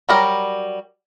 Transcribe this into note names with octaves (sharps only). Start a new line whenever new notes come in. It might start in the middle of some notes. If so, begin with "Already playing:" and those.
F#3 G3 A#4